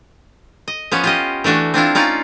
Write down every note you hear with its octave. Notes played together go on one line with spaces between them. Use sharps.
D#5
F3 B3 C#4
F4 G4 D#5
E3 A3 D4 F#4
C4 D4 E4 F4
C#4 D#4 F4 D5